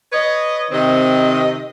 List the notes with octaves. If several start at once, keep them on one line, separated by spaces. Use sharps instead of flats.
B4 C#5 D#5
C3 D#3 C4 D#5